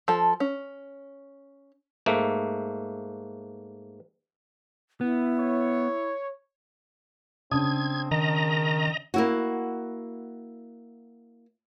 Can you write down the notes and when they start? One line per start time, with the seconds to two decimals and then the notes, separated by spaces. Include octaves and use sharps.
0.08 F3 A4
0.40 C#4
2.06 G#2 A3 A#3
5.01 B3 E4
5.38 C#5
7.51 C#3 C4 D4 D#6 G#6
8.11 D#3 A#4 D#5 A#5
9.14 A#3 E4 F#4